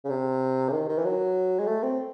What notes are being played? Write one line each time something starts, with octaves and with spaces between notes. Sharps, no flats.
C#3
C3
C#3
D#3
D#3
E3
F#3
G#3
A3
C4